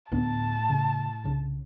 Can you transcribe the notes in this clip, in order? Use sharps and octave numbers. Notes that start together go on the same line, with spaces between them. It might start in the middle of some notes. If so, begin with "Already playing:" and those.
D2 A2 B3 D4 A5
C#3
C2 C#3 D4